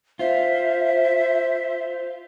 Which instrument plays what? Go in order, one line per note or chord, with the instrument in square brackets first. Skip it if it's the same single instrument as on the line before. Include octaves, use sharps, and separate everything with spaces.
[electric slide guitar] F4 [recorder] C5 [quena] E5